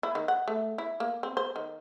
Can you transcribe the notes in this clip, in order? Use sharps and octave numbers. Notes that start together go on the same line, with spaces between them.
E4
D#3
F#5
A3
E4
A#3
C4
C5
D#3